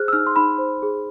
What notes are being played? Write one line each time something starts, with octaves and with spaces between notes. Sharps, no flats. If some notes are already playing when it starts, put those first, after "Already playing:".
Already playing: G#4 C5 F6 F#6
E6
D#4 F6
C6
D#4 B5
C5
G#4